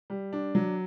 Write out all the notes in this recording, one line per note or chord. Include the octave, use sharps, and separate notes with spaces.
G3
D4
F#3